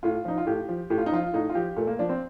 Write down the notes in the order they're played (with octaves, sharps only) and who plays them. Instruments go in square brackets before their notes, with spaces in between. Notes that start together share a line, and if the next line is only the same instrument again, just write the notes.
[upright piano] A2 F4
F3 D#4
F4
A2 G4
F3
A2 G4
F4
D#4
F3 F4
A2 D#4
F4
F3 G4
A#2 A3
A#3
F3 D4
C4